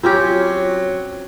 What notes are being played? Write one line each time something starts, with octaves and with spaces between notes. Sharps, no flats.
F#3 C4 C#4 F4 G4